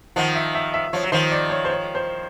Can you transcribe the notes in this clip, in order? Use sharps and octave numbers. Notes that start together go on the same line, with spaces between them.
D#3 F3 F#5
E5
E5
E5
F3 C#5
F#3
D#3 F3 C5
D5
C#5
C5
C#5
C5